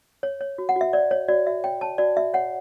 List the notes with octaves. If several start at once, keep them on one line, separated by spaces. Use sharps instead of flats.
C#5
C#5
F#4
F#5
F#4 E5
C#5 D5
C#5
F#4 D5
F#4 E5
C#5 G5
C#5 A5
F#4 D5
F#4 E5
C#5 F#5